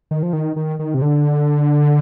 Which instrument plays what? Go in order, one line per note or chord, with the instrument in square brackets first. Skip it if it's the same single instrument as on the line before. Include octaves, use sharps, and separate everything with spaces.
[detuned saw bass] D#3
F3
D#3
D#3
D#3
C3
D3